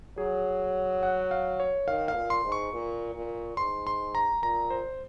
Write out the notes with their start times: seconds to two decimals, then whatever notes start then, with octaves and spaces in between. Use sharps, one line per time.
0.18 F#3 G#4
1.03 F#5
1.31 F5
1.60 C#5
1.87 D#3 F5
2.08 F5
2.15 A#2
2.30 C6
2.44 G#2
2.52 C#6
2.73 A#2
3.15 A#2
3.57 G#2 C6
3.87 C6
4.15 A#5
4.42 A#2 A#5
4.70 C5